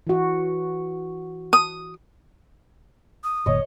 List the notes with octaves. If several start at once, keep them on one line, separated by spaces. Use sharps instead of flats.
E3 F#4
D#6
D#6
F#1 A#2 D#3 C#5 D#5